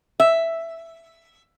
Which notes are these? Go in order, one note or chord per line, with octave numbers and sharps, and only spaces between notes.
E5